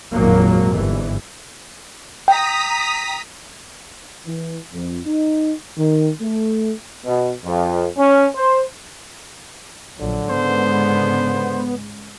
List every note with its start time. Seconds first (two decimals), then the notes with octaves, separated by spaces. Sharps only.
0.14 G#1 F2 A#2 F#3 A#3
0.74 G1 G#2 E3
2.28 G5 A#5 D#6 B6
4.26 E3
4.73 F2
5.05 D#4
5.78 D#3
6.21 A3
7.05 B2
7.44 F2
7.97 C#4
8.36 C5
10.01 A#1 D3 F3 F#3
10.30 G#2 C#3 G#3 B3 C5